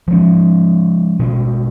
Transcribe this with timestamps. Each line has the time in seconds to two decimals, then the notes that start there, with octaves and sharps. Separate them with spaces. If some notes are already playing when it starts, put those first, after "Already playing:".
0.08 F3 G#3 C#4
1.20 B2 G#3 C#4